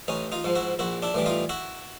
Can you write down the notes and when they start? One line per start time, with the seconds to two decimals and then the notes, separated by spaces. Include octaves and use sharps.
0.08 A1 C#4 D#4
0.32 D#4 F4
0.44 G#2 F3
0.56 E4 F#4
0.79 A#1 E4 F#4
1.02 D4 E4
1.14 A2 E3 G3
1.26 D#4 F4
1.49 E4 F#4